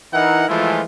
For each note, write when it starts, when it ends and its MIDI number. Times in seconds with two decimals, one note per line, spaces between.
0.13 0.46 52
0.13 0.46 63
0.13 0.46 64
0.13 0.46 70
0.13 0.46 78
0.48 0.82 52
0.48 0.82 53
0.48 0.82 56
0.48 0.82 57
0.48 0.82 64
0.48 0.82 65